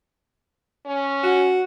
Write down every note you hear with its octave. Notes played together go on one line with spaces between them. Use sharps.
C#4
F#4